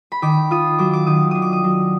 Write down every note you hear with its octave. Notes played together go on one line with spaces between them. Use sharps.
B5
D#3 D6
F4 D#6
F#3 D6
D6
D#3 D#6
D4 D#6
D6
D#6
F#3